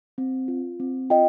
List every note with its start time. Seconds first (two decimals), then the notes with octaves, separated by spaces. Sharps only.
0.18 C4
0.48 F4
0.80 C4
1.10 F4 D#5 G5